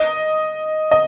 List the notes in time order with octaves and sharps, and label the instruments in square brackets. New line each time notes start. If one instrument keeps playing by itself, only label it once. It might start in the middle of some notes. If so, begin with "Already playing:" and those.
Already playing: [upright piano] D#5
D#5